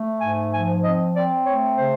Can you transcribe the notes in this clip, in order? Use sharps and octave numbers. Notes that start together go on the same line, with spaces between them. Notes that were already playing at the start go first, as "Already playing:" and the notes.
Already playing: A3
G#2 G#5
F3 G#5
C4 D#5
C4 D5
A3 C#5
C#3 C5